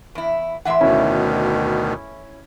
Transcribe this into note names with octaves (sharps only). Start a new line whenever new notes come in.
E2 E4
A2 E3 E5 F#5 C6
D2 B2 D#3 C#4 E4